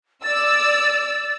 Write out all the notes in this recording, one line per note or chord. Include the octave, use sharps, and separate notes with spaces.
D5 E6 A6